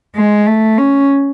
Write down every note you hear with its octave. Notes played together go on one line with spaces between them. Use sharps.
G#3
A3
C#4